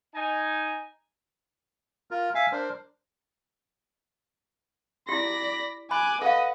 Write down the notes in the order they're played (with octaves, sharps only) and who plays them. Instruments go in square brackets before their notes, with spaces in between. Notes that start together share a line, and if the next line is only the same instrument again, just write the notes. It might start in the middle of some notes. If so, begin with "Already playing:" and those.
[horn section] D#4 G#5
[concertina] F4 A#4
E5 F5 G#5
D4 A#4 C5
[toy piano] E4 G4 [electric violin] D5 A#6 [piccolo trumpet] B5
[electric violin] G#5 D6 [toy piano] B5 [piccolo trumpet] F#6
[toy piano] A4 F5 [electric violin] B4 F#5 [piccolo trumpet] D#5